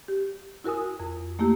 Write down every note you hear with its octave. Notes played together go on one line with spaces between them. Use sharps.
G4
E4 F#4 A#4 G#5 D#6
F2
A3 A#3 E4 G4